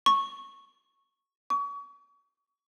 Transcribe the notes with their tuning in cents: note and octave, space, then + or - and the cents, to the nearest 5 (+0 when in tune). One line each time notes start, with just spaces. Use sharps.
C#6 -10
C#6 +35